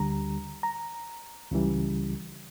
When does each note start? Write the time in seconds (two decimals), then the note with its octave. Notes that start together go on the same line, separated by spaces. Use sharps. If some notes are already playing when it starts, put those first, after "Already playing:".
Already playing: D2 D3 G3 A#5
0.63 A#5
1.51 C#2 C#3 E3 G3